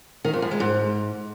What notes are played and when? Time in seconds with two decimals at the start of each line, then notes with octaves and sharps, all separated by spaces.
0.25 D#3
0.33 F2
0.42 F#2
0.51 G#3
0.60 G#2